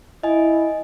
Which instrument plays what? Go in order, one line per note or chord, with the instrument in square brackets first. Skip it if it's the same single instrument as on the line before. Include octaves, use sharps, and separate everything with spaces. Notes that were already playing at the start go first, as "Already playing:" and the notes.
[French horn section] E4 [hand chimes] D#5 G#5